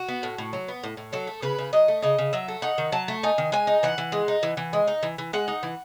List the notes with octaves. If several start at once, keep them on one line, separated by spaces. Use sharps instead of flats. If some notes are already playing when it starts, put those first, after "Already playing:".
Already playing: F#4
B3
A2
A2
F#3
B3
A2
A2
F#3 A4
A3
C#3 B4
C#3
F#3 D#5
A3
C#3 D#5
C#3
F#3 E5
A3
D#4 F#5
D#3
F#3 A5
A3
D#4 G#5
D#3
G#3 G#5
D#4
E3 F#5
E3
G#3
D#4
E3
E3
G#3
D#4
E3
E3
G#3 F#5
D#4
E3